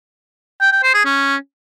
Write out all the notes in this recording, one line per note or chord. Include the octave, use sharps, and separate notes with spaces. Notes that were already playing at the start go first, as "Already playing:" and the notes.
G5
G5
C5
G#4
C#4